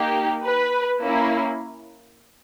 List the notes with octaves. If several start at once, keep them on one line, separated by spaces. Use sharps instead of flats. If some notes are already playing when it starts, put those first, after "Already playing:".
Already playing: A#3 D#4 G4
B4
A#3 C#4 E4